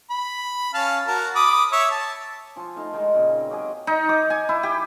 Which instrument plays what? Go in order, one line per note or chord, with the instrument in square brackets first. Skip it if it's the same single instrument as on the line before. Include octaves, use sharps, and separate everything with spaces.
[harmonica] B5
C#4 F5 A5
F#4 A#4 A5
B5 D6 D#6
C#5 E5
A5
[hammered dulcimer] F3 F4 G#5
A3 D#4 D#5 F5
D#3 G#3 A#4
A#2 C#3
C4
F#3 G4 G#4 D#5
D#4
D6
G#5
E4
G4